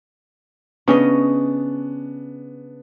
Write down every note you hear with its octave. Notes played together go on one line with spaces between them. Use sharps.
C#3 B3 C#4 D4 D#5